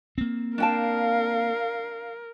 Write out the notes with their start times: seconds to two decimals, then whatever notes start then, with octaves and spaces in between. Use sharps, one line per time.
0.18 A#3 C4
0.58 D4 A#4 F5 G5 A5